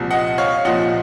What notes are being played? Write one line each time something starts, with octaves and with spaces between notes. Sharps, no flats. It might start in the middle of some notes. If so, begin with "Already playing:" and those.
Already playing: C2 A#2 F3
D#5 F#5
C#5 F5
C2 A#2 F3 D#5 F#5